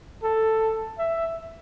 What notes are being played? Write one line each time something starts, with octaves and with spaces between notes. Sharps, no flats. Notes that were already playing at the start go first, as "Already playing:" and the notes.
A4
E5